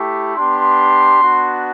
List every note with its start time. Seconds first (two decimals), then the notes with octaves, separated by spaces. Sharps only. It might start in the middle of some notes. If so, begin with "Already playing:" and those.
Already playing: A3 E4 G4
0.35 B3 D4 G4 C6
1.18 B3 D4 F#4